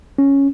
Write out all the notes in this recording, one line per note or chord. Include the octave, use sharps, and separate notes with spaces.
C#4